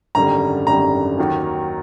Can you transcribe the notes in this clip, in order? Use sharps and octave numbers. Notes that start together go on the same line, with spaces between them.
G#1 F#2 D3 G3 A#5
G#1 F#2 D3 G3 A#5
D#2 D#3 F#3